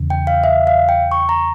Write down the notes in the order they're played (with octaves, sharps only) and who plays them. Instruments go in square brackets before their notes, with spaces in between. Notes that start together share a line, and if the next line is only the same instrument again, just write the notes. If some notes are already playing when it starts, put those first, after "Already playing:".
Already playing: [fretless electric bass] E2 C#3
[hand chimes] G5
F5
E5
F5
G5
C#6
A#5